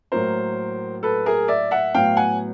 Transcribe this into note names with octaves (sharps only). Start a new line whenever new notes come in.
A2 F#3 A#3 A#4 C5
A4 B4
G#4 A#4
D5 E5
E5 F#5
A2 F#3 B3 F5 G5
F#5 G#5